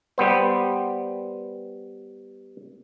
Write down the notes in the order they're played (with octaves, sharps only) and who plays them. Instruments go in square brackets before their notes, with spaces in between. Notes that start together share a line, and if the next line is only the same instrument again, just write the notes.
[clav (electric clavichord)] G3 B3 C5